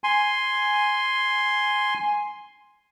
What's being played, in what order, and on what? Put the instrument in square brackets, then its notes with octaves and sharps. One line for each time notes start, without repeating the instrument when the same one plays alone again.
[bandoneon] G#5 C6